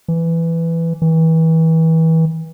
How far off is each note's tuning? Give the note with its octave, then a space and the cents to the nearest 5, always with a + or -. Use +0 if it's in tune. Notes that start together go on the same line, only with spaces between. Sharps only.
E3 +10
E3 -30